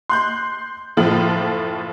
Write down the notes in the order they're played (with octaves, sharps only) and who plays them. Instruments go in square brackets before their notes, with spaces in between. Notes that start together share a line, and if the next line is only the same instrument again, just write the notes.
[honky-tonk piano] C6 F#6 G6
F#1 A2 F3